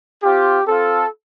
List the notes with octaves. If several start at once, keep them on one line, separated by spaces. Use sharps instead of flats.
C4 F4 G4
C4 F4 A4